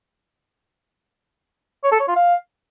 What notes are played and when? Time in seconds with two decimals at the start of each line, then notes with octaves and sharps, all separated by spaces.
1.84 C#5
1.92 A4
2.00 C#5
2.08 F4
2.16 F5